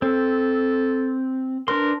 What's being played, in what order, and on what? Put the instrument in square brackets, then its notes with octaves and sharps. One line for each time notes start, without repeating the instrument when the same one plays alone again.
[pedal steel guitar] C4 [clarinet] A4
[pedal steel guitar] D4 B4 C6 [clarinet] A#4